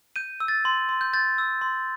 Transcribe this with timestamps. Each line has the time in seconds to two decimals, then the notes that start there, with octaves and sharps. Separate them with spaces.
0.16 G6 D#7
0.40 E6
0.48 A6
0.65 C6
0.89 C6
1.01 G6
1.13 G6 A6
1.38 E6
1.61 C6